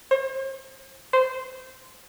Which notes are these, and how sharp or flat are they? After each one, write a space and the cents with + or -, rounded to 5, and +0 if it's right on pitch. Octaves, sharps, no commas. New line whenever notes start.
C5 +45
C5 -15